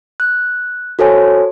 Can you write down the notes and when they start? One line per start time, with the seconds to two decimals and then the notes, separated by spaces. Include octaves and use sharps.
0.20 F#6
0.99 F#4 A4 C5 C#5 G#5